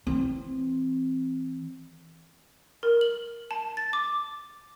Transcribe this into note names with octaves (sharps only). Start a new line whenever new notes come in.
E3 C4
A#4
F#7
A5
A6
D6